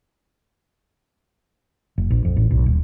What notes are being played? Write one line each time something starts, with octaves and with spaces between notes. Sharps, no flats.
F1
A#1
F2
A1
B1
D#1